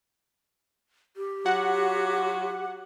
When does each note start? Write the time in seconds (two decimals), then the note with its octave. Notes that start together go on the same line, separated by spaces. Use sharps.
1.17 G4
1.46 F#3 F4 F#4 F#5